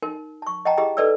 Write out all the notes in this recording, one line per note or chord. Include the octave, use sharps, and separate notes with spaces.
D#4 A#4
A5 C#6
D#5 F#5 G5 A5 A#5
E4 G4 G#4 D#5 A#5
D#4 A4 B4 D5 D#5 E6